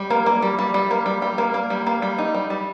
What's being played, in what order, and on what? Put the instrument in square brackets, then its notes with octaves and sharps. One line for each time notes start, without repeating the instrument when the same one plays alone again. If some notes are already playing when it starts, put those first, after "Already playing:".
Already playing: [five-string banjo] G3
A#3
A#3
G3
G3
G3
A#3
G3
G3
A#3
A#3
G3
A#3
G3
D#4
G3
G3